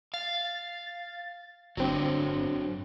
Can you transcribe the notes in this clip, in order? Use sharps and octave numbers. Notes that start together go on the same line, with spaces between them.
F5 A6
G1 F#3 C4 D4